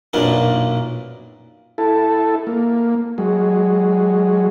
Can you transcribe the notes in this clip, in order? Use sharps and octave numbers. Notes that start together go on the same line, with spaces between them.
B1 F#2 A#2 A#3 D4
E4 A4
A#3
F#3 G#3